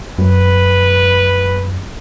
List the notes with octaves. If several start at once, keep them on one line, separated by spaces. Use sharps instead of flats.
F#2 B4